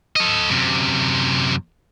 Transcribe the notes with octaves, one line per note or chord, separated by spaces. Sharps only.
A4 D#5
F#2 C3